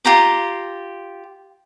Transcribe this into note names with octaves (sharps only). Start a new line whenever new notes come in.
F4 G4 A#5 D6